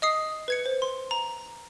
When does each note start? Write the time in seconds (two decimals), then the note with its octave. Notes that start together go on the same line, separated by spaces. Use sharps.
0.02 D#5 D#6 C7
0.48 B4 G#6 C#7
0.66 C5
0.82 C6
1.11 A#5